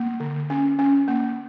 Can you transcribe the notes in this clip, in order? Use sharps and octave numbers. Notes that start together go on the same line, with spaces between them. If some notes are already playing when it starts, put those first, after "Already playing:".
Already playing: A#3
D3
C#4
C#4
A#3